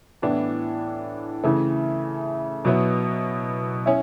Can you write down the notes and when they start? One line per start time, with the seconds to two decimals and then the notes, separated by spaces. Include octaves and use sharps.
0.22 A2 E3 B3 D4
1.43 C#3 E3 A3 E4
2.65 B2 F#3 B3 E4
3.86 C#4 E4